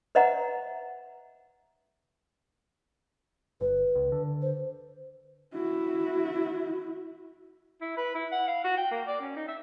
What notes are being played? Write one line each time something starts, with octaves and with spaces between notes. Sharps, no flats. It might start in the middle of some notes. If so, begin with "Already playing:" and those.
B4 C5 D#5 E5 F#5 A#5
G1 B4
C#2
D3
C5
E4 F#4
E4
B4
E4
F#5
F5
F#4
G5
A#3
D5
C#4
D#4
E5